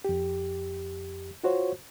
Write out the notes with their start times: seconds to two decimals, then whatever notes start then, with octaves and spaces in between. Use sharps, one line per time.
0.05 F2 G4
1.44 F4 F#4 C5 C#5